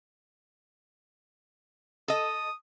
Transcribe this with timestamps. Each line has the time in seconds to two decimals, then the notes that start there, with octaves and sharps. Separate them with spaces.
2.08 A4 D#5 D#6